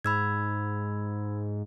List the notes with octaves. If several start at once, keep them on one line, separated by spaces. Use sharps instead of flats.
G#2 B5 E6 G#6